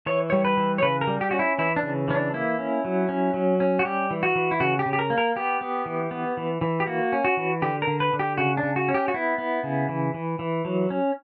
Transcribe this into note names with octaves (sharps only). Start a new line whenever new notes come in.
E3 C#5
G3 C#5
B4
E3
C#5
C#3 B4
A#4
G3
G4
C#4 F#4
E4
E3 E4
D4
C#3
E3 C#4
D4
A#3 E4
C#4
F#3
C#4
F#3
C#4
F#4
G3 G4
E3
F#4
E3
E4
C#3 F#4
G4
C#3
G4
A#4
A#3
A#4
B3 G4
B3
E3
B3
E3
E3
G4
A#3 F#4
C#4
F#4
E3
D3 G4
A#4
D3
B4
D3
G4
C#3 F#4
D4
C#3
F#4
C#4
G4
F#4
B3 E4
B3
C#3
E3
E3
E3
F#3
C#4